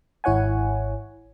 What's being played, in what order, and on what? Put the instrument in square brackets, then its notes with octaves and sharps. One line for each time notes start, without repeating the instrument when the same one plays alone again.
[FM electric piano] G#1 E4 C#5 F#5 G#5